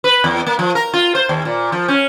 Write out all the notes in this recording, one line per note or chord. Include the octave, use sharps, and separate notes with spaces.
B4
E2
A#3
F3
A#4
F4
C5
D#2
A#2
F3
C#4